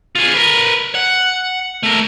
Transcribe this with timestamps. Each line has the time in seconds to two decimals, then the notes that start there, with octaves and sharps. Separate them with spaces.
0.15 F4 G#4
0.34 A#4 B4
0.95 F#5
1.83 A3 A#4